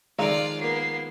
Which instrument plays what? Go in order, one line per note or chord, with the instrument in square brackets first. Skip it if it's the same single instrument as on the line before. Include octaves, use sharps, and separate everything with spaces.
[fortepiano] D#3 F3 G#3 [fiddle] F4 D5 [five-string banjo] A4 F5 A#5
[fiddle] A#3 B3 [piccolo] C7